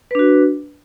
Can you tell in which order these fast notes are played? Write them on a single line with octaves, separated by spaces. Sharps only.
B4 D4 F#4